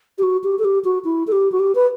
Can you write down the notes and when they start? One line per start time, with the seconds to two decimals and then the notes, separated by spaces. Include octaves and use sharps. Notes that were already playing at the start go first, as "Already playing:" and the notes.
0.18 G4
0.23 F#4
0.44 G4
0.59 A4
0.65 G4
0.85 F#4
1.04 E4
1.27 A4
1.32 G4
1.52 F#4
1.59 G4
1.75 B4